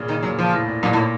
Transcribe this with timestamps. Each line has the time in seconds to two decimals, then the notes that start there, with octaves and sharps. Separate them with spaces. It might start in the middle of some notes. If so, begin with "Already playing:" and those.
Already playing: A#2 C#3
0.08 D#3
0.23 A#2 F#3
0.39 F3
0.53 A2
0.68 A#2
0.83 F#2 A#2
0.93 A2